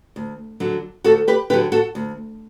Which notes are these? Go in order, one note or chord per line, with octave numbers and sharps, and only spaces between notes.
D2
D3 F#3
D2 F#4 A4
G4 B4
D3 F#3 G4 B4
F#4 A4
D2